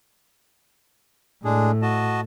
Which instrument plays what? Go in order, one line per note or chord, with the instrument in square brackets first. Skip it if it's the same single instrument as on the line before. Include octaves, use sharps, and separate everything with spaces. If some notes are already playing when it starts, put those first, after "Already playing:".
[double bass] A2 [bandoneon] G#3 D4 G#4
[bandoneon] F#4 D#5 A5